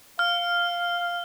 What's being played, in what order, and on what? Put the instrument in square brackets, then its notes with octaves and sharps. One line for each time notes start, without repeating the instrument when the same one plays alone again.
[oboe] F5 [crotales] F6